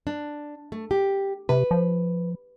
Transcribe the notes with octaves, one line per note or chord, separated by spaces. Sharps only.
D4
A3
G4
C3 B4
F3